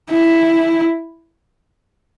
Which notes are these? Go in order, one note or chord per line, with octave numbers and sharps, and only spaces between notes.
E4